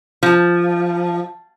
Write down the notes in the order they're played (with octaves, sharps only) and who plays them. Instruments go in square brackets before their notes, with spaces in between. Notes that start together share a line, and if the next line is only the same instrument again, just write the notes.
[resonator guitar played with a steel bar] F3